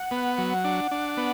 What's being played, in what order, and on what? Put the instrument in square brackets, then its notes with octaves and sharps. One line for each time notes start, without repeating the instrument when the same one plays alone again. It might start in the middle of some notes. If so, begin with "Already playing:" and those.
Already playing: [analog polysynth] F#5
[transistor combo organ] B3
F#3
D4
D4
B3